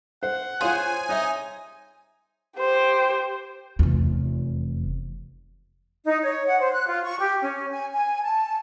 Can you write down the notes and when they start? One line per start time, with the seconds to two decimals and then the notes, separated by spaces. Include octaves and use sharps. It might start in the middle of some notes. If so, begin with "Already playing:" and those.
0.23 C5 F#5
0.61 F4 G#4 C5 C#5 F5 G#5
1.09 D#4 C#5 E5
2.58 G4 C5
3.79 F1 E2
6.05 D#4
6.23 C#5
6.47 F#5
6.60 C5
6.74 F#6
6.88 F4
7.05 C#6
7.21 G4
7.42 C#4
7.71 G#5
7.93 G#5
8.24 A5